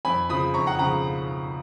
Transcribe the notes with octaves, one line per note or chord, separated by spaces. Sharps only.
F2 G#5 B5
C#3 F3 B5 D#6
F2 A#5 C#6
F#5 A#5
C#3 F3 F#5 A#5